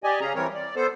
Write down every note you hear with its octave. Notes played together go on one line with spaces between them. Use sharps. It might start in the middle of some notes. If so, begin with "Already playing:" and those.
G4 D5 D#5 G#5
C#3 C#4 G#4 A#5
E3 G3 C4 A#4 C#5
D5
B3 A4 C5